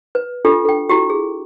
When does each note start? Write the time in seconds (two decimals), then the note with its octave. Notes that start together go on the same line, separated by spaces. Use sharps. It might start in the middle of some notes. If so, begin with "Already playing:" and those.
0.15 B4
0.45 D4 F4 G4 A4
0.65 A4 G5
0.89 E4 F#4 G4
1.10 G#4